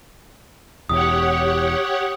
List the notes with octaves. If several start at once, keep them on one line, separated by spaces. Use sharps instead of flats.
E1 E2 G4 C#5 F#5 D#6